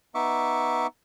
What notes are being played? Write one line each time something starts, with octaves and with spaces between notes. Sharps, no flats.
B3 D#4 E5 C#6 D6